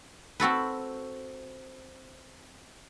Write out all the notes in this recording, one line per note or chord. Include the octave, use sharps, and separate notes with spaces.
C4 F#4 A4 B4